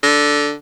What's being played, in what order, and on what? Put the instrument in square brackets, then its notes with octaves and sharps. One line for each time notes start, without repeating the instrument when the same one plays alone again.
[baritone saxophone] D3